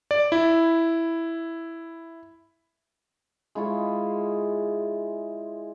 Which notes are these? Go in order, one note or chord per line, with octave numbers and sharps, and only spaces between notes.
D5
E4
G#3 E4 F4 C#5